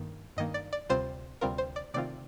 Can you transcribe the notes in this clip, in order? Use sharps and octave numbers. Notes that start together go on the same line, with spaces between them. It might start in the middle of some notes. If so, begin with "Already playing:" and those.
Already playing: G2 D#3 A#3
G2 D#3 A#3 D#5
D5
D5
D2 C3 G3 C4 F4 C5
D2 C3 G3 C4 F4 A#4
C5
D5
C3 D#3 A3 C4 F4 D5